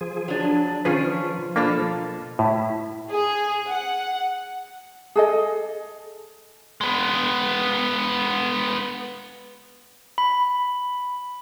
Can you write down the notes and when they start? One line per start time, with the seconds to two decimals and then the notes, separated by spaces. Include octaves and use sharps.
0.01 F3 G#4
0.28 F#3 D4
0.85 D#3 F3 C#4 D4 F4 G#4 B4
1.56 B2 A#3 D4 F4 A4
2.39 A2 E4
3.10 G#4
3.69 F#5
5.16 G#4 A4 D#5
6.81 G#3 B3
10.18 B5